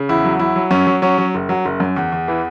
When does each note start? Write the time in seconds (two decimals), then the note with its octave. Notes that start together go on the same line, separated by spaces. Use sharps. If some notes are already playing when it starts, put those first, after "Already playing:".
Already playing: C#3
0.09 E2 E4
0.24 F#3
0.39 F#3 E4
0.56 F#3
0.71 F#2 C#4
0.87 F#3
1.02 F#3 C#4
1.18 F#3
1.34 F#1
1.49 F#3
1.65 F#1
1.80 F#2
1.96 E2
2.12 E2
2.28 E3